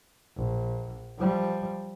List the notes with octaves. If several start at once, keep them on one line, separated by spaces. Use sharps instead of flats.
A#1
F3 G3